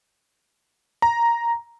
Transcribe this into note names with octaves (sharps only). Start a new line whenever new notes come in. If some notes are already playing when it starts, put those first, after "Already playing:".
A#5